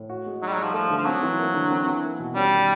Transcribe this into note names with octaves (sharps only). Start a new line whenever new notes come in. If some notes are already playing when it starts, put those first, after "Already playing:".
Already playing: A2
F#4
G#3
F#3 D#4
G3
F#3
G3
F3
F3 A3
D3
F3
F#3 C4
E3
A#3
D3
C4
E3
A#3
B2
G3 C#4
D#3